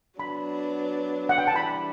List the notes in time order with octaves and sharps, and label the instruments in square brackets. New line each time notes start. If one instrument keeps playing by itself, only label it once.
[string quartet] F#3 B3 D4 [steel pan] B5
[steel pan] F#5
G5
A5
[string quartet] E3 G3 D4 [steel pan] B5